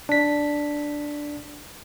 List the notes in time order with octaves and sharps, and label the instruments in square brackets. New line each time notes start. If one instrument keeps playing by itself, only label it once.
[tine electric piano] D4 B6